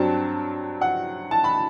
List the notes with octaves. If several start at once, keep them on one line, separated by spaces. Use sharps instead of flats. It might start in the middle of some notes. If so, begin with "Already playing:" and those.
Already playing: G2 F#3 C4 A5
F#5
A5
B5